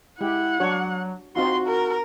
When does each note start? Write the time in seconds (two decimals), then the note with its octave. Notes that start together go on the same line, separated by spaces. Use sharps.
0.21 G#3 E4 G4 F#5
0.60 F#3 D4 F#4 C#5
1.36 C4 D#4 F4 F#4 C6
1.67 A#4